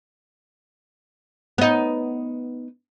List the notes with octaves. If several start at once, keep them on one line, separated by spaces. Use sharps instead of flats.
B3 D#4